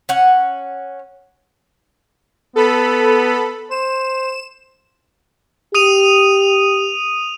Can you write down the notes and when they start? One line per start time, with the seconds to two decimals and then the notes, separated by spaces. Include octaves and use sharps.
0.09 C#4 F#5
2.56 B3 A4 B5
3.71 C5 E7
5.75 G4 D#6 D#7 F7